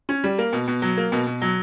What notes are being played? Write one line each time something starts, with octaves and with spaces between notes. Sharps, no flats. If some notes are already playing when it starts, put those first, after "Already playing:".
C#4
G3
A#3
B2
B2
F#3
A#3
B2
B2
F#3